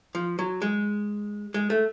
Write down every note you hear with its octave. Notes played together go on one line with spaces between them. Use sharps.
F3
F#3
G#3
G#3
A3